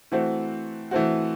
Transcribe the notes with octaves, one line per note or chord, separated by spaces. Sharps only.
E3 A3 C4 F#4
E3 A3 C4 F#4